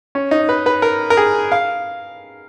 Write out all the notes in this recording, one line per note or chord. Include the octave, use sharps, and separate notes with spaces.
C#4
D#4
B4
B4
A#4
A#4
G#4
F5